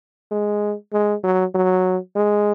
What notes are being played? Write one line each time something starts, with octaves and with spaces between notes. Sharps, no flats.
G#3
G#3
F#3
F#3
G#3